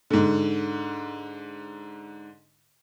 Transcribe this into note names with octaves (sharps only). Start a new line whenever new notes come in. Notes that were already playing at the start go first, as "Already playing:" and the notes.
G#2 D3